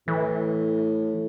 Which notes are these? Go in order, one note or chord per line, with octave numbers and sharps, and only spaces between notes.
A2 E3